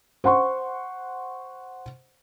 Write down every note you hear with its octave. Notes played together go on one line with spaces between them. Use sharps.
C5 F#5 C6 C#6